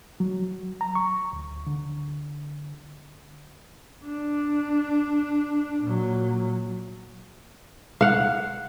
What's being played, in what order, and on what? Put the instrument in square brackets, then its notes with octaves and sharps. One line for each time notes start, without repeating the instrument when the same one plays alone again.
[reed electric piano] F#3
A#5
C#6
D2
D3
[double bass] D4
A#2 F#3
[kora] F5 F#5